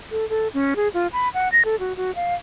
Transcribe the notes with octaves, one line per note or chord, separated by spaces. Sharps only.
A4
A4
C#4
G#4
F4
B5
F#5
A#6
A4
F#4
F#4
F5